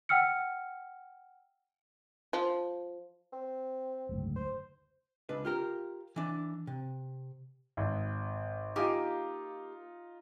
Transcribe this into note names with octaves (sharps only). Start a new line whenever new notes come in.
F#5 G5 E6 F6 C#7
F3
C4
F#1 D2 G#2
C5
C#2 D4 B4
F4 G4 A#4
E3 D4
C3
G#1
A#3 D#4 F4 G4 G#5